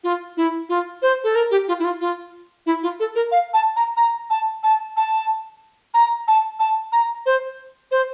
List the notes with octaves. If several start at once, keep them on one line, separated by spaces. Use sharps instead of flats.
F4
E4
F4
C5
A4
A#4
G4
F4
E4
F4
F4
E4
F4
A4
A#4
F5
A5
A#5
A#5
A5
A5
A5
A#5
A5
A5
A#5
C5
C5